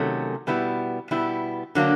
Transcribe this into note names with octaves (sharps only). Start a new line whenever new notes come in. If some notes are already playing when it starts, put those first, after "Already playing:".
Already playing: C3 D#3 F#3 A3 C#4
B2 G3 B3 E4
B2 G3 B3 E4
D3 F#3 A#3 D4